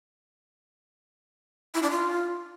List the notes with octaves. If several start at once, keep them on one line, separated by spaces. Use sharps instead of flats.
E4
D4
F4